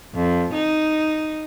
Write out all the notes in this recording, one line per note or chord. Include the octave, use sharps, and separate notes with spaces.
F2
D#4